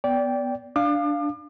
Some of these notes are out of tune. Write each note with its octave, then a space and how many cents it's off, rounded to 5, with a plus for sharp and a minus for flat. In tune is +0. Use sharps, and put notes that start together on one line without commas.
B3 +0 D5 -25 G5 +0
D4 +0 F5 +0 D6 +40